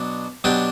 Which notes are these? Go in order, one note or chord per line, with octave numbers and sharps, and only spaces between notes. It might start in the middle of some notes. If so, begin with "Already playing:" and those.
Already playing: B2 F#3 B3 D4
B2 F#3 B3 D4 G4